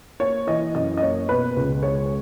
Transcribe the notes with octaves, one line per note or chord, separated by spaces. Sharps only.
A#3 C#5
E3 D#5
F#2 D#5
D#5
A#3 C#5
B2 B4
C#2
G#3 C#5